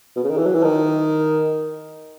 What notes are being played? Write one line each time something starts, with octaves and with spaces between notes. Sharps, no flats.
B2
C#3
D#3
E3
F#3
E3
D#3